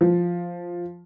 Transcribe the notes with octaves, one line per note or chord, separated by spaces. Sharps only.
F3